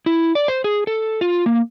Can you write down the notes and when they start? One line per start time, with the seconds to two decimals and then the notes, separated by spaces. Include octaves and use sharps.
0.06 E4
0.35 D5
0.48 C5
0.64 G#4
0.87 A4
1.21 F4
1.46 A#3